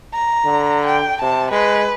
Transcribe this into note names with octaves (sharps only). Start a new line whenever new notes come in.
A#5
D3
G5
C3 A5
G#3 B4